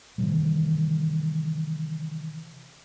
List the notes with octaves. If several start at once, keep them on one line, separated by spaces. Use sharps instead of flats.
C3 D#3 E3 G3